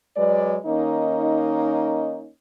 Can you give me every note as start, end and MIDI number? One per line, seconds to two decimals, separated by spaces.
0.17 0.58 54
0.17 0.58 56
0.17 0.58 71
0.17 0.58 74
0.66 2.29 51
0.66 2.29 58
0.66 2.29 61
0.66 2.29 63